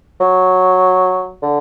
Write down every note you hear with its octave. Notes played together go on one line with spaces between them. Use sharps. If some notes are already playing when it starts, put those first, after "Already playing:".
F#3
D3